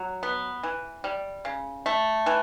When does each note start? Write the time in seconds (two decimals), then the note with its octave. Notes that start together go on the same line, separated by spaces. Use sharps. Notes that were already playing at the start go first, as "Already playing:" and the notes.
Already playing: F#3
0.23 B3
0.63 E3
1.04 G3
1.45 C#3
1.86 A3
2.26 E3